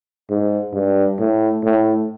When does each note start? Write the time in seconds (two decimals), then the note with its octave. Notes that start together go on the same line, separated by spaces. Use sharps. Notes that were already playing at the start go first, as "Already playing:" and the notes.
0.30 G#2
0.73 G2
1.19 A2
1.63 A2